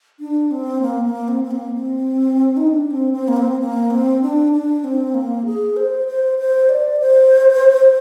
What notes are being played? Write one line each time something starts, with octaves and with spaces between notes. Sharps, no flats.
D4
C4
A#3
A#3
C4
C4
A#3
C4
D#4
D4
C4
C4
A#3
C4
A#3
C4
D4
D4
C4
A#3
G#4
C5
C5
C5
D5
C5